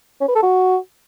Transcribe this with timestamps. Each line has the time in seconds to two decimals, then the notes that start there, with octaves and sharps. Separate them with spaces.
0.21 C#4
0.28 B4
0.35 A4
0.43 F#4